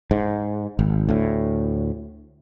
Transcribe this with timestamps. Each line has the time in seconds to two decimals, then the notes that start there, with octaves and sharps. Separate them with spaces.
0.11 G#2
0.79 G#1
1.09 D2 A2